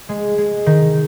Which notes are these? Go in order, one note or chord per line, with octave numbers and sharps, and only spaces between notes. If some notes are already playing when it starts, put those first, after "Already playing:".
G#3
G#3
D#3